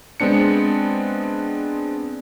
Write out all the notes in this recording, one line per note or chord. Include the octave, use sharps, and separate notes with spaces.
G#3 B3 C4 D4 C#7